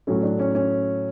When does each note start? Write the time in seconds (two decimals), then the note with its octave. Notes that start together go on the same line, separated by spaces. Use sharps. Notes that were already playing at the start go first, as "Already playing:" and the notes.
0.07 A2 F#3 A3 C#4
0.23 D4
0.39 C#4
0.55 C#4